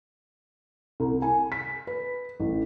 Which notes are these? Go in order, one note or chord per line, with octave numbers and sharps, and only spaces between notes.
C2
G#5
B6
B4
A1